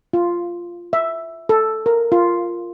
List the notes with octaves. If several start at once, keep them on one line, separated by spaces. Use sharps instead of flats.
F4
E5
A4
A#4
F4